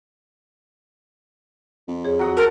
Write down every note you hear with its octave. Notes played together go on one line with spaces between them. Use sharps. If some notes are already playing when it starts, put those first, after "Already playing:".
F2
E2 G#4 C#5
F#3 F#5 D#6
F#4 A4 A#4 C5 A5